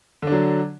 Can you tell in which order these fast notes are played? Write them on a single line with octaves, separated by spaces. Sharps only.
D3 D4 F#3